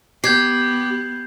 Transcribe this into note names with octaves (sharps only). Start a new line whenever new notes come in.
B3 G4 G6 G#6 C7